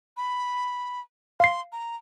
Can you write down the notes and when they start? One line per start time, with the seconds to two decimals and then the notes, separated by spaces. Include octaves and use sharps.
0.17 B5
1.40 F5 C6 C7
1.72 A#5